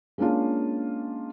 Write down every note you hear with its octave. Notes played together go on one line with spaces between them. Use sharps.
G#3 A#3 C#4 D4 F4